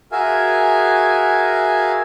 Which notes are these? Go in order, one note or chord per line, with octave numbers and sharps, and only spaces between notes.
F#4 G#4 A#4 E5 F5 G#5